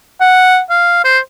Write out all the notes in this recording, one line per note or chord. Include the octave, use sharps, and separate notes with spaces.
F#5
F5
C5